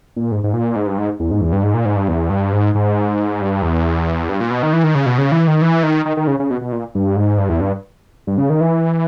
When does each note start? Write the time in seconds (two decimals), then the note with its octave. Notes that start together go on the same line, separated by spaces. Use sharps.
0.16 A#2
0.32 G#2
0.44 G#2
0.53 A#2
0.76 G#2
0.87 G2
0.98 G#2
1.20 E2
1.31 G#2
1.41 E2
1.53 G2
1.63 G#2
1.74 A#2
1.85 G#2
1.96 G2
2.08 E2
2.30 G2
2.53 G#2
2.75 G#2
3.41 G2
3.62 E2
4.29 G2
4.40 A#2
4.51 B2
4.63 D#3
4.73 E3
4.84 D#3
4.95 C#3
5.06 B2
5.18 C#3
5.32 E3
5.48 D#3
5.62 E3
5.83 D#3
6.06 D#3
6.17 D#3
6.27 C#3
6.40 C#3
6.51 B2
6.61 B2
6.72 A#2
6.95 G2
7.16 G#2
7.38 G2
7.49 E2
7.61 G2
8.27 G2
8.38 C#3
8.50 D#3
8.61 E3